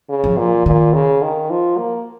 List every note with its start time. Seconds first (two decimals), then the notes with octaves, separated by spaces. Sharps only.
0.09 C#3
0.24 F3
0.38 A#2
0.66 A#2 D#3
0.94 C#3
1.23 D#3
1.50 F3
1.78 A#3